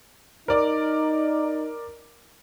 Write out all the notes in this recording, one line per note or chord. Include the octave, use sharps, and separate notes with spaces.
D#4 A#4 D5 D6